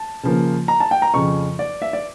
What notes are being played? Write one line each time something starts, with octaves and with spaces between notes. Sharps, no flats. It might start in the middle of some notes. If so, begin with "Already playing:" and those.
Already playing: A5
C#3 F3 A#3
A#5
A5
G5
A#5
F2 C#3 F3 C#6
D5
E5
D5